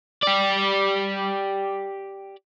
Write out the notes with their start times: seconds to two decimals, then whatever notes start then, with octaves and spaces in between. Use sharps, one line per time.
0.23 G4 D5